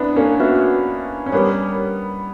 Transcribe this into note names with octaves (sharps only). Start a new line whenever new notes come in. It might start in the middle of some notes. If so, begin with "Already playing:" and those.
Already playing: B3 C#4 D4 E4
A#3 C#4
B3 F#4 B4 E5
C#4
G3 B3 G4 A#4 C#5